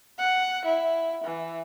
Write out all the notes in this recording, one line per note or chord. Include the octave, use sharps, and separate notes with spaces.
F#5
E4
E3